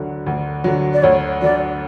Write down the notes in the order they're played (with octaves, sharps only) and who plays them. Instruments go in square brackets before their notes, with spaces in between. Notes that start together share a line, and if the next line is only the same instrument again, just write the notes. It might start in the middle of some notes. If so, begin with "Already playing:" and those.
Already playing: [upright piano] D2 D3 F#3
D2
D3 F#3
[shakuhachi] D5
[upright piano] D2 [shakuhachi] C#5
[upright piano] D3 F#3 [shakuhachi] D5